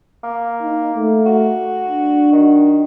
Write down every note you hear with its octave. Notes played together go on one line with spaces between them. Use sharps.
A#3
D#4
A3
F#4
D4
D#3